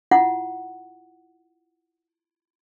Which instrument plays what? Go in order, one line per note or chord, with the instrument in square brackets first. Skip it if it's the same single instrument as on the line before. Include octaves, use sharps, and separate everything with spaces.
[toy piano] E4 F4 F#5